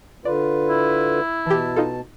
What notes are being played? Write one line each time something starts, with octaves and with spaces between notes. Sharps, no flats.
D3 F4 B4 D5
E4
B2 E3 G4 A5
D#4 F4 A4